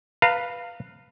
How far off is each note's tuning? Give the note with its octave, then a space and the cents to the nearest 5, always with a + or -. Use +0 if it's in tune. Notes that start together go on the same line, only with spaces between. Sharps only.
B4 -10 F5 +0 A#5 -35